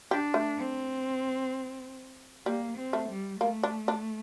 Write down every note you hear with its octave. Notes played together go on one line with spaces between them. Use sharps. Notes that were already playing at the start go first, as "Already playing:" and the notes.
D4 G4
A3
C4
G3 A#3
C4
A3
G3
A3 A#3
D4
D4